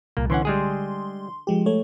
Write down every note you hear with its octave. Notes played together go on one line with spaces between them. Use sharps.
C2 A#2 A#3
D3 E3 C#4 F#5 C6
G3 G#3 G#4
F3 G#3 G4
A3 C#5